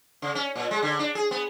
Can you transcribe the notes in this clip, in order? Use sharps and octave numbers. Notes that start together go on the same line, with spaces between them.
C#3
C#4
A#2
G#3
D3
D4
G#4
B3